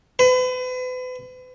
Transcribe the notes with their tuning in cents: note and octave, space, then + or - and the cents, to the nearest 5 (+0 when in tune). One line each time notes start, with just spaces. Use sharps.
B4 +40